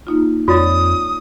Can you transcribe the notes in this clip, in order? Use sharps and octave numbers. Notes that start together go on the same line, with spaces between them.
A#3 D#4 F4
F2 F4 C#5 D5 D#6 A6